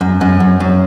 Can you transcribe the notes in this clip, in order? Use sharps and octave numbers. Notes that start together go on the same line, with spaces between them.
F#2
F#2
F#2
F#2